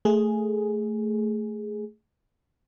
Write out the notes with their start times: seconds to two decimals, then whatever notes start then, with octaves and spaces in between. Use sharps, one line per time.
0.05 A3 G#4